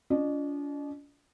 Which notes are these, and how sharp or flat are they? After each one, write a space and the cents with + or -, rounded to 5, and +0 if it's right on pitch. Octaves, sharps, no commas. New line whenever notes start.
D4 -45 F4 +0 D#5 -40